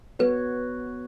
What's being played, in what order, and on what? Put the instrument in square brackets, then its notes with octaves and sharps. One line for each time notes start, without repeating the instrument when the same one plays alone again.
[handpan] B3 F#4 C#5 [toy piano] B4